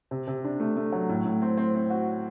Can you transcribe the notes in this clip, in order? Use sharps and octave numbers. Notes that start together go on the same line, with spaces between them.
C3
C3
D4
A3
A3
F#3
A2
A2
C4
C4
C4
F#4